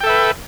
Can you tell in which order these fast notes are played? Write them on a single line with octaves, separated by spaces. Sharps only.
G5 A4 E5 B4